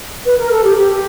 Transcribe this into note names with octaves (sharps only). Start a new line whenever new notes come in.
B4
A#4
A4
G4
G4